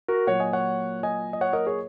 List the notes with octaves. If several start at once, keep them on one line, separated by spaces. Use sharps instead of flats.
F#4 A#4
A#2 F#3 A#3 C#5 F#5
D#5 G#5
C#5 F#5
D#5 G#5
D#5
C#5 F#5
A#4 D#5
G#4 C#5